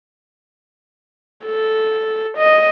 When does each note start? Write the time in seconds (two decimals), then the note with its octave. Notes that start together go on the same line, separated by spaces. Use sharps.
1.45 A4
2.38 D#5